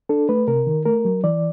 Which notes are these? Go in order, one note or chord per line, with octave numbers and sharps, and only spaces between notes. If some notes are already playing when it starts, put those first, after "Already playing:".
D4 A4
A3 B4
C3 A#4
D#3
A3 A#4
F#3
E3 D5